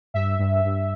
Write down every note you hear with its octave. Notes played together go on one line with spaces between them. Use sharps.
G2 E5
G2
G2